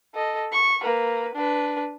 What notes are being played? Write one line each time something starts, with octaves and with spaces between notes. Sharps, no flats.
A4 D#5
C#6
A#3 B4
D4 B4